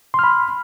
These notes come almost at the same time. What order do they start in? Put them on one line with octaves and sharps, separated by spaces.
C6 F6 B5